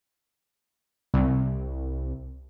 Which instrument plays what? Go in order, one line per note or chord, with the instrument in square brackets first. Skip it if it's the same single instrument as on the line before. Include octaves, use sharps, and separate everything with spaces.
[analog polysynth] C2